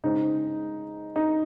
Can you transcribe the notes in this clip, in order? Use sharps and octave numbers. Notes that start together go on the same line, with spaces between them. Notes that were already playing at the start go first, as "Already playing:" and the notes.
C#3 G#3 C4 D#4
D#4